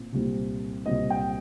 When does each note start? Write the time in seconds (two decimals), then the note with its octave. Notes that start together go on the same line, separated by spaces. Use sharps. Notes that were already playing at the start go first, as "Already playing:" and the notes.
Already playing: A#2 C4
0.12 C2 A#2 G3 C4
0.86 C2 A#2 G3 C4 D#5
1.10 G5